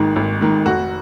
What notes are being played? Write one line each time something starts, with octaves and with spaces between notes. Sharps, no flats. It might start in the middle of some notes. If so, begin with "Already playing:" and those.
Already playing: G#1 G#2 D#3 G#3
G#1
G#2 D#3
F1 F#4